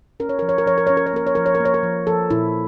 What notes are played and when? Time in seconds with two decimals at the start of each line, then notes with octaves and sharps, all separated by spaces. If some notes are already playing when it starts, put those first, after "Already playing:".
0.20 C#4 A#4
0.29 C#5
0.39 F3 A#4
0.49 C#5
0.58 A#4
0.66 F3 C#5
0.78 A#4
0.87 C#4 C#5
0.97 A#4
1.07 C#5
1.13 A#3 A#4
1.27 C#5
1.35 F3 A#4
1.46 C#5
1.55 A#4
1.60 A#3
1.65 C#5
1.74 A#4
1.83 F3
2.07 F3 A4
2.30 A#2 E4